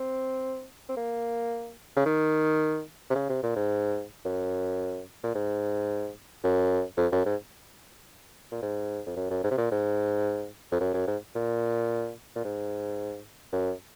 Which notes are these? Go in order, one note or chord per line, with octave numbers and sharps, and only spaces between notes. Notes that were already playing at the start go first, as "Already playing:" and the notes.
Already playing: C4
C4
A#3
C#3
D#3
C3
C#3
C3
A#2
G#2
F#2
A#2
G#2
F#2
F2
F#2
G#2
A#2
G#2
F2
F#2
F#2
G#2
C3
A#2
G#2
F2
F#2
F#2
G#2
A#2
A#2
G#2
F#2